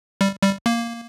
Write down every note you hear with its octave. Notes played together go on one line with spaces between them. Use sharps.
G3
G3
A#3